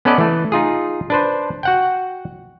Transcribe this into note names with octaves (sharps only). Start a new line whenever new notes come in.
B3 C#4 A4 B4 D5 D#5
E3 A3
D#4 F4 G#4
D4 B4 C5
F#4 F#5 G5